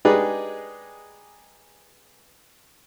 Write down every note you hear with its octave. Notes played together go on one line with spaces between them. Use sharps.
G#3 D4 D#4 G4 G#4 B4